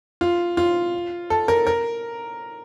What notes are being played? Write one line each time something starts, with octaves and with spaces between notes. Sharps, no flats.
F4
F4
A4
A#4
A#4